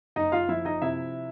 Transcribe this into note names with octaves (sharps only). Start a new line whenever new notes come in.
F#1 D#4 D#5
F4 F5
F3 E4 E5
D#4 D#5
C3 E4 E5